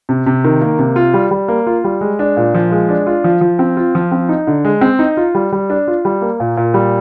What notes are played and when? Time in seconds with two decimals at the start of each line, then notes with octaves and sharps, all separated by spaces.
0.09 C3
0.26 C3
0.44 D#3
0.61 A#3
0.79 C3
0.96 F4
1.14 G3
1.31 G3
1.48 A#3
1.67 F4
1.84 G3
2.01 G#3
2.19 D4
2.37 A#2
2.55 F3
2.71 G#3
2.89 D4
3.07 F4
3.24 F3
3.41 F3
3.59 C4
3.77 F4
3.95 F3
4.12 C4
4.29 D#4
4.47 D3
4.65 G#3
4.81 C4
4.99 D#4
5.17 F4
5.35 G3
5.52 G3
5.70 D4
5.88 F4
6.05 G3
6.21 A#3
6.40 A#2
6.57 A#2
6.74 G3